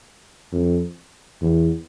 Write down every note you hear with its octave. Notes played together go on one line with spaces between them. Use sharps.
F2
E2